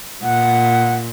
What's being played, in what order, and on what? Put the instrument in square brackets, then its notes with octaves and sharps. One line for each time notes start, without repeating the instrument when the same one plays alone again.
[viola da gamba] A#2 [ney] F#5